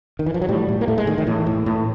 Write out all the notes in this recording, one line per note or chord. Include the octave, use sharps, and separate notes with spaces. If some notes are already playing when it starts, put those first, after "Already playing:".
D#3
E3
F3
F#3
A2 G3
A2
A#3
A2 A3
G#3
A2 D#3
D#3
A2 E3
A2
A2